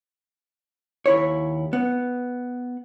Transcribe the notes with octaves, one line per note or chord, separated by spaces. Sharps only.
D#2 E4 C#5
B3